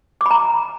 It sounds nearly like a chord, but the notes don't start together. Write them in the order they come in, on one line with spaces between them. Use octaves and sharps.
D6 B5 A#5